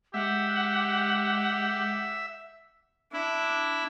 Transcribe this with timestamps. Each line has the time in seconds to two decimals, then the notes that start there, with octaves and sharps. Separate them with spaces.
0.14 G#3 G4 E5 F#5
3.13 D4 E4